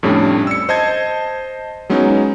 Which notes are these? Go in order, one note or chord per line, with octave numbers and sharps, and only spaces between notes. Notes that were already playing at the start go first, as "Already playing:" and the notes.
F2 A2 G3 C#4 D4
E6 C#7
C5 D#5 A5 G#6
F#3 G#3 B3 C#4 D#4